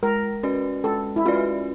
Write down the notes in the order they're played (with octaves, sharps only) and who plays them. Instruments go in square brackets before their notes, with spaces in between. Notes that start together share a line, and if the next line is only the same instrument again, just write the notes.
[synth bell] G#3 [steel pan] A#4
[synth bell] C#4 F#4 B4 D5
[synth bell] G#3 [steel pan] A4
[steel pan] E4
[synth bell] C#4 F#4 B4 D5 [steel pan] F4